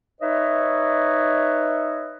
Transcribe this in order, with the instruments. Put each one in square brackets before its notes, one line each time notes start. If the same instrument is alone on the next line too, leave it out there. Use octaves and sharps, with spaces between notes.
[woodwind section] D#4 B4 C#5 D#5 E5